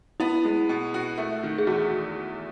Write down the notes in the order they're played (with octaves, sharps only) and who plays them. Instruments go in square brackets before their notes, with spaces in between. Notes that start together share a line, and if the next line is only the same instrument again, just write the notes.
[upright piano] B3 [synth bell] E4
[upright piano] G#3
B2
F#4
A3
D#3
[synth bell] G#4
[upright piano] E2 [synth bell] F#4